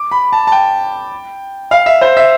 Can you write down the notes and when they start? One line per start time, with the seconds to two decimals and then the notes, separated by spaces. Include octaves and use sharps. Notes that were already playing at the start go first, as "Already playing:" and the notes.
Already playing: D6
0.11 B5
0.33 A5
0.47 A5
0.52 G5
1.71 F5
1.86 E5
2.01 C5
2.17 E5